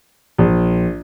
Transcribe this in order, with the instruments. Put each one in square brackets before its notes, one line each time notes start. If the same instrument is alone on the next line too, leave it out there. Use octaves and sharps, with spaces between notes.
[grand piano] A#1